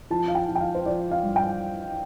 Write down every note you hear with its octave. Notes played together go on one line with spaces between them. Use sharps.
F3 A5
F5
G5
F3
G5
F5
C5
F3 D5
F5
G2
G5